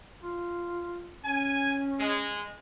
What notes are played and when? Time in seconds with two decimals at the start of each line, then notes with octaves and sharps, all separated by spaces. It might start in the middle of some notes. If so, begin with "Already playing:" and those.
0.23 F4
1.25 C#4 G#5
1.99 G#3